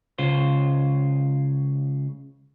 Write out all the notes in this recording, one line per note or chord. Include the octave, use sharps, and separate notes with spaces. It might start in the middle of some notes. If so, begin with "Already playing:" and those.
C#2 C#3 F4 C5